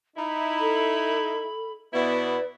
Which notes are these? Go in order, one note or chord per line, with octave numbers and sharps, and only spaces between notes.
D#4 E4 B5
A4
B2 B3 E4 B4 D5